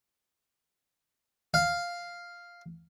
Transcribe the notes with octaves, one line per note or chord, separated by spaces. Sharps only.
F5